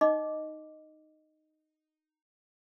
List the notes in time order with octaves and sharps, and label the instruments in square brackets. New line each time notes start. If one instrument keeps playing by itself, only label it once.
[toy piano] D#4 D#5 D6